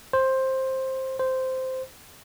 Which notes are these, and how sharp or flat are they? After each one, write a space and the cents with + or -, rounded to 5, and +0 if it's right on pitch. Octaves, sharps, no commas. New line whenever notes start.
C5 +10
C5 -10